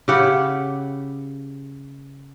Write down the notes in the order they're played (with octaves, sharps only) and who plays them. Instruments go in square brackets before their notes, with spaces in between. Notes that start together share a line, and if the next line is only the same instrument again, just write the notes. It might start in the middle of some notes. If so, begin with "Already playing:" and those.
[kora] C#3 E4 G4 F#5